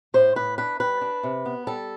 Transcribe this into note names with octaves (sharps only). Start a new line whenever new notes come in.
A2 C5
A2 B4
D4 B4
G3 B4
D4
C3
B3
G3 A4